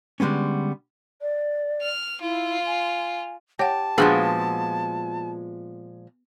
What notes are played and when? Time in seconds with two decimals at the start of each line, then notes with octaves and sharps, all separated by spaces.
0.20 D3 G3 G#3 B3 C#4
1.21 D5
1.82 F6
2.21 E4 F4
2.66 G#5
3.59 G4 C#5 F#5 A5
3.98 A#2 F3 G#3 B3 D4 F#4 G#4